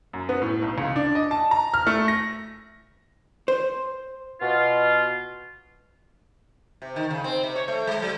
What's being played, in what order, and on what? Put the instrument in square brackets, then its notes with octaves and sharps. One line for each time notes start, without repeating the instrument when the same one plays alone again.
[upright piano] F#2
B3
A2
B1
C#2
D4
D#5
A5
A#5
F6
A3
A#6
[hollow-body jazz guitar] C5
[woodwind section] B2 F4
[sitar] C3
D#3
C#3
C4
C3
C#5
A3
G#3
F#3